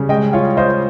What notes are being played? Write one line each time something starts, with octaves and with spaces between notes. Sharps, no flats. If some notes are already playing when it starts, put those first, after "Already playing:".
Already playing: C#3 G3
G#3 D#5 G5
F4 C#5 F5
F4 C5 D#5